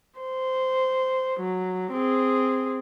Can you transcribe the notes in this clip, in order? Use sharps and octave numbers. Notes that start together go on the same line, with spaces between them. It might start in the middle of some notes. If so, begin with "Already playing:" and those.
C5
F#3
C4 G#4